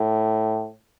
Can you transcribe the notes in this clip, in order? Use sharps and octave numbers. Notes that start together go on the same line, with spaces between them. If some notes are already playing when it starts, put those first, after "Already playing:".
Already playing: A2